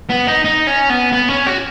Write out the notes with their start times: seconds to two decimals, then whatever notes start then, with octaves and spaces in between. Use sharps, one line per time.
0.10 B3
0.28 D#4
0.45 D#4
0.67 C#4
0.89 B3
1.13 B3
1.30 C#4
1.47 F#4